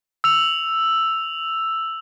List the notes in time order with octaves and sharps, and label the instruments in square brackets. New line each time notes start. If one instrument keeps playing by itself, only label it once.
[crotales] E6 F7